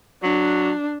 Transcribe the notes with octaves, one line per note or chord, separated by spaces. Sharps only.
F#3 D4